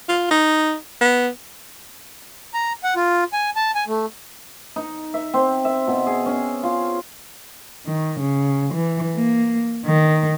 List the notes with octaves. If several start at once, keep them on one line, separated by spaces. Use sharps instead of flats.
F4
D#4
B3
A#5
F#5
F4
G#5
A5
G#5
A3
D#4
E5
C4
E5
B2
G#4
C#4
F4
D#3
C#3
E3
A#3
D#3